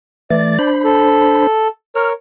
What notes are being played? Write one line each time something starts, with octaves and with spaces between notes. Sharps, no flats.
E3 A3 D5 A6
D4 C5 B5
A4
A#4 C#5 F6